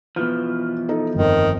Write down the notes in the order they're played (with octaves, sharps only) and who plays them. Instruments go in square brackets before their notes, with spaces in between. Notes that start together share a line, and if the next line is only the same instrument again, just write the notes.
[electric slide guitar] B2 E3 F3 [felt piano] F6
[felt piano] D#4 A4 D#5
[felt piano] G1 F2 [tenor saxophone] D#3